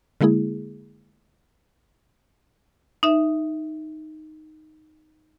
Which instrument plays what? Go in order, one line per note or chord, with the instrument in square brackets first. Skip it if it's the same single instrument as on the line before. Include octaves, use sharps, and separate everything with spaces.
[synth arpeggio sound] D3 G#3 A#3 E4 G#4
[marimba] D#4 E5